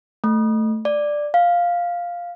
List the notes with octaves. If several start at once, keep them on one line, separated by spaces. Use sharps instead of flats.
A3
D5
F5